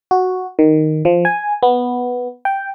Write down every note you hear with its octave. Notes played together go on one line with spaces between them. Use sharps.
F#4
D#3
F3
G#5
B3
G5